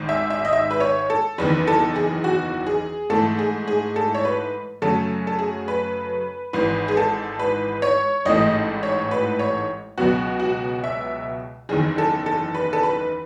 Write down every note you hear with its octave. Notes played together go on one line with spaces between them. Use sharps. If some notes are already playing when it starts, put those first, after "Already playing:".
Already playing: G#1 G#2 D#3
E5
E5
D#5
E5
B4
C#5
A4
F#1 E2 D#3 B4
A4
G#4
F#4
G#4
G#2 E3 A3 A4
G#4
G#4
A4
C#5
B4
F#2 C#3 F#3 A3 A4
A4
G#4
B4
G#1 G#2 E3 B4
G#4
A4
B4
C#5
A1 G#2 E3 A3 D#5
C#5
B4
C#5
C#2 B2 F#3 B3 F#4
F#4
E5
F#1 E2 D#3 G#4
A4
A4
B4
A4
B4